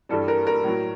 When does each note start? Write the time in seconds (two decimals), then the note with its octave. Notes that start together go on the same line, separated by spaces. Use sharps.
0.09 G2 E3 G3 A4
0.28 A#4
0.47 A#4
0.64 A2 F#3